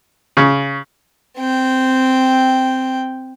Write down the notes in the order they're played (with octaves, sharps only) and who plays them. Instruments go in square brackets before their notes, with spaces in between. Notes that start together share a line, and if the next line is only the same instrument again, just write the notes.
[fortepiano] C#3
[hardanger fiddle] C4 G5